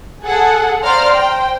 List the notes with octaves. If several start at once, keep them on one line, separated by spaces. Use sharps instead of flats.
G#4 A4 F#5
C5 D5 F5 A#5 C6 F6
C5 G5